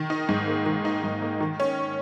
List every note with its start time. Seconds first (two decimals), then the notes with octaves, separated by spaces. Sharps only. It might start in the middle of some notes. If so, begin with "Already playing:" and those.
Already playing: D#3
0.10 D#4
0.29 G#2
0.47 A#3
0.66 D#3
0.85 D#4
1.04 G#2
1.22 A#3
1.40 D#3
1.60 C#4